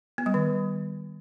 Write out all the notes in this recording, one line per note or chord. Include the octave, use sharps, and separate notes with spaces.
B3
G3
D#3